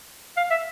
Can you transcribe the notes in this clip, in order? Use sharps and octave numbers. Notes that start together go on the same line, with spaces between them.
F5
E5